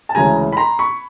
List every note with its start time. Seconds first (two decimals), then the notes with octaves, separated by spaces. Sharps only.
0.09 A5
0.15 D2 C#3 E3 G#3 G#5 A#5
0.52 B5
0.57 A#5 C6
0.79 B5 C#6